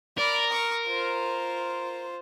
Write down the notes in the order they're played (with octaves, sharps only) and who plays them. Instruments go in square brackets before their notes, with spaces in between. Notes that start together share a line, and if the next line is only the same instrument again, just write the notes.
[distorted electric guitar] A#4 [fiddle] D5 B5
[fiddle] C#6 D#6
F4 C5